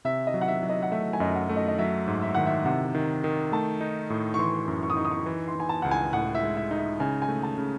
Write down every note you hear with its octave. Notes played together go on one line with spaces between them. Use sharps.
C3 E5
D#5
F#3
F#5
E5
F#3
D#5
F#5
A3 E5
G#5
F#2 D#5
E5
F#5
A3
D#5
D#5
F#3 E5
G#2
E5
D#3 F#5
E5
C3 F#5
D#3
D#3
A3 A5
D#4
A2
C#6
E3 C6
F#2
C#6
D#6
D#4 C#6
D#6
C#6
E3
C6
E3 G#5
A5
C#2 F#5
G#5
A2 F#5
E5
G#3
E5
D#4
E5
C#3 G#5
G#5
A3
A5
C#3